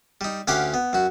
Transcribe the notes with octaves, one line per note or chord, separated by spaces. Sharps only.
G3 D#4
D2 C#4 G4 F5 F#5 D6
B3
F#2 F#4